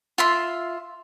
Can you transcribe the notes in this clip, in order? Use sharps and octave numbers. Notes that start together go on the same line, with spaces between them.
F4 E5 C6